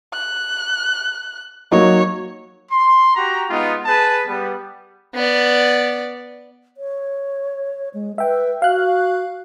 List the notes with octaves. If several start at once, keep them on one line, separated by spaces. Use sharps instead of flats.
F#6
F#3 A#3 D#4 C#5
C6
F#4 G4 A#5
G#3 B3 D#4 F4
G#4 B4 A5
G3 B3
B3 D5
C#5
G#3
B4 E5 G5
F#4 F5 F#6